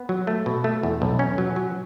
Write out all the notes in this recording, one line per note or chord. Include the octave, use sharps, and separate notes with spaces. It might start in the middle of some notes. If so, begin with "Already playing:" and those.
Already playing: B3
F#3
A3
B2
A3
E2
B1
C#4
F#3
F#3